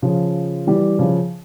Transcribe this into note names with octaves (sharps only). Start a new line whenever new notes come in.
C#3 F3
E3 G3
C#3 F3